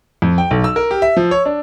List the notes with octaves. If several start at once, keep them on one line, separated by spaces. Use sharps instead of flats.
F2
G5
B1
E6
A#4
G4
E5
F3
C#5
D4